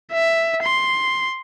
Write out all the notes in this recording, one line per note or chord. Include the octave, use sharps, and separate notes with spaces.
E5
C6